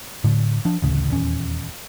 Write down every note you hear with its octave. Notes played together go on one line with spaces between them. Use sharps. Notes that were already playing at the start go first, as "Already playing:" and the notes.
A2 D3
F3 D4
A1 D2 C#3
D#1 E2 C#4